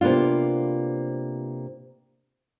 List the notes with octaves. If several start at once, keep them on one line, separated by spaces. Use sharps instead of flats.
C3 A#3 B3 D4 F4